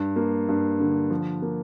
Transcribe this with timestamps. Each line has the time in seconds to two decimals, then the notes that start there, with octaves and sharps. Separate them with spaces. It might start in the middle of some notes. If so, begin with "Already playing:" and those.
Already playing: G2
0.16 A#3
0.49 G2
0.80 D3
1.10 F3
1.42 A#3